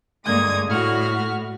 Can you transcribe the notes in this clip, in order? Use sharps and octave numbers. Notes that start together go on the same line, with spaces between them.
D2 G2 G#3 A#3 D#6 G#6
A2 F#4 F6